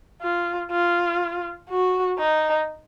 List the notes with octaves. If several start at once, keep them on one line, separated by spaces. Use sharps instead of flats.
F4
F4
F#4
D#4